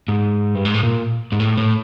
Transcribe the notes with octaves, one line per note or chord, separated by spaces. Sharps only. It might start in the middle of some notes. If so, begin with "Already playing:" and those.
G#2
G2
G#2
A2
A#2
G#2
A2
A2